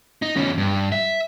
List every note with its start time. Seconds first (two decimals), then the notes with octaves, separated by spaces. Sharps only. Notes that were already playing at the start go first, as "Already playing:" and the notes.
0.22 D#4
0.36 E2 C#4
0.58 G2
0.92 E5